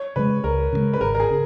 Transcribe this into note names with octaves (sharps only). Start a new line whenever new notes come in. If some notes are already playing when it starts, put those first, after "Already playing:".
Already playing: C#5
C#3 E3 G#3 B4
C#2 A#4
C#3 E3 G#3
B4
G#1 A#4
A#4
G#4
C#3